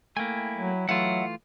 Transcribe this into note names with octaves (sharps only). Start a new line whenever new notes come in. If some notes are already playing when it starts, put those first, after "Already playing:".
A3 A#3 E4 G5 G#5
F#3
E3 F#3 A3 F4 E5 F#5